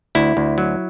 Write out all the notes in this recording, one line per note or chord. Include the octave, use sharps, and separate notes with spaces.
D2 E4
D2
F#3